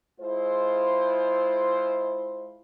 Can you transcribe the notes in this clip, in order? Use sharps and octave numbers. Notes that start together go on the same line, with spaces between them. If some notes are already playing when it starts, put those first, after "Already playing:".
G#3 E4 F4 C5